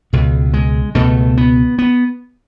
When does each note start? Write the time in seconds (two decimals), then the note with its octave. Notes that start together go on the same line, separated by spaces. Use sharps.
0.13 C#2 B2
0.54 G#3
0.95 C#2 B2 A3
1.37 B3
1.79 B3